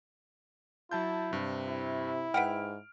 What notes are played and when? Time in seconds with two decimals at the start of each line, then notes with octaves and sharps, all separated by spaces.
0.91 F#3 E4 A5 G6
1.33 G2 C3
1.68 E4
2.34 G#2 B4 F#5 G5 F6 D7